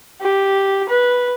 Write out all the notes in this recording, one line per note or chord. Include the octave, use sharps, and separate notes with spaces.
G4
B4